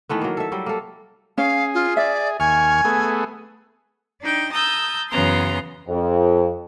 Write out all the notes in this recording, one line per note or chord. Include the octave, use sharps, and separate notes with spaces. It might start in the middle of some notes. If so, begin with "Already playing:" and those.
D#3 E3 A3 B3
F#3 A#3
A4 E5
F#3 G3
A#3 A4
C#4 G#4 F5
F4
D5 E5
D#2 G#5 C#6 F6
A3 B3 G#4
D4 D#4 G5
A5 A#5 D#6 E6 G6
F#2 C#3 E3 B3 A#5 C6
F2